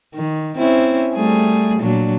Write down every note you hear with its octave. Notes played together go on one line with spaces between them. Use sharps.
D#3
C4 C#4 E4
G3 A3 G#4
A#2 F#3 D4